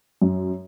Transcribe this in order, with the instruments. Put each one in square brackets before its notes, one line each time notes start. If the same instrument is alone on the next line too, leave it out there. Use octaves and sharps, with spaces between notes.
[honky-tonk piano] F#2